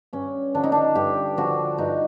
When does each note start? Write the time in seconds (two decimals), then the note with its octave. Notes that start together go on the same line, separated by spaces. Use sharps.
0.13 G2 C#4
0.54 D3 F3 D4
0.64 D#4
0.72 D4
0.95 G2 G4
1.37 D3 F3 F#4
1.78 G2 D#4